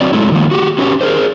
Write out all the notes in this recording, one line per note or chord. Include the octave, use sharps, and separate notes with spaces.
F#3 C4 D5
F#3 G#3 A3 E4
D#3 F3 A#3
F#4 G4
C#4 F#4 G4 C#5
G#4 A#4 C5